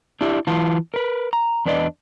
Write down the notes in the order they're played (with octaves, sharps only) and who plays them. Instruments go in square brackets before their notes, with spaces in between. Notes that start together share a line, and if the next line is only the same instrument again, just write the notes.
[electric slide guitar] D4 E4 G4 E5
E3 E4 F4 B4 F5 A5
A#4 B4
A#5
E2 D4 B4 D5 D#5